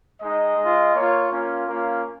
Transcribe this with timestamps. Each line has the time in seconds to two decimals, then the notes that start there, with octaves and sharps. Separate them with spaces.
0.21 G#3 D#4 D#5
0.56 G#3 F4
0.94 A#3 F4 C#5
1.30 A#3 C#4 F4
1.67 A#3 C#4 F4